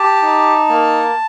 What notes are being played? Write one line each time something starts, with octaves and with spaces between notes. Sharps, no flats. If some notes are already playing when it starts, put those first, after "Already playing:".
Already playing: G4 A5
D#4
A#3